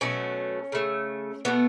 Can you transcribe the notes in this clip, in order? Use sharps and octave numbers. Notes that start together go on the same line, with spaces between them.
B2 F#3 A3 C#4
C#3 A3
B2 F#3 A3 B3